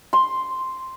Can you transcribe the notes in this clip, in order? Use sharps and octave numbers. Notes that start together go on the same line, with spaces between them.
C6